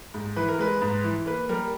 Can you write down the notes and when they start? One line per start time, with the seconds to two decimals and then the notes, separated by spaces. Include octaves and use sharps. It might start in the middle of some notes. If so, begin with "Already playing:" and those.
0.14 G#2
0.36 E3 B4
0.49 A#4
0.59 G#3 B4
0.82 G#2
1.04 E3
1.26 A#3 B4
1.49 G3 A#4